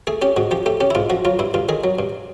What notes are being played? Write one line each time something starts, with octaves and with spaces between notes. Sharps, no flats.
A3 G#4
C#4 G4
G#2 F#4
F3 G4
A3 G4
C#4 G4
E4
G#2 F4
F3 F#4
F#3 F4
G2 E4
G2 F4
D#3 G#4
F#3
G2